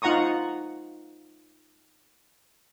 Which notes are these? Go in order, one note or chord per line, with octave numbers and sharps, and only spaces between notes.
D#4 F4 F#5 A#5 C#6 D#6